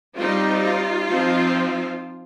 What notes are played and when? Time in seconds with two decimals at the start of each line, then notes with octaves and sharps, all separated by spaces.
0.16 G3 C4 D#4 F4
0.63 F4
1.09 F3 C4 D#4